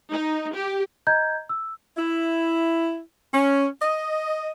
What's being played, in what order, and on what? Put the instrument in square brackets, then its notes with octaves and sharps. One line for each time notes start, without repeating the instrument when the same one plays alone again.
[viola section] D#4
G4
[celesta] D#5 A#5 G6 G#6
E6
[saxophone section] E4
C#4
D#5